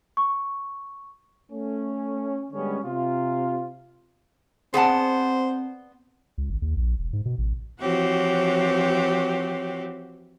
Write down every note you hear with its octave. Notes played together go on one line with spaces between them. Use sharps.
C#6
A3 C#4
D3 G3 G#3 B3 C#4
C3 F4
B3 C4 G#4 C5 D5 F#5 A5
C#2
G#1
D#2
A#1
E1
G#2
B2
A1
E3 F3 C4 F#4 G4 C#5